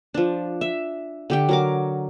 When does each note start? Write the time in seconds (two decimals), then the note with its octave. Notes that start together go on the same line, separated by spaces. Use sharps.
0.14 F3 D4
0.61 E5
1.30 D3 G4 G5
1.49 F#3 A#4 D6